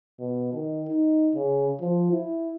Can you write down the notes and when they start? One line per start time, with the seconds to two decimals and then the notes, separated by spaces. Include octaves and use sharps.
0.19 B2
0.53 D#3
0.89 D#4
1.35 C#3
1.81 F3
2.12 E4